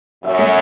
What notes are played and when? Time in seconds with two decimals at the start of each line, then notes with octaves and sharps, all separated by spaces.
0.24 F#2 E5
0.39 A3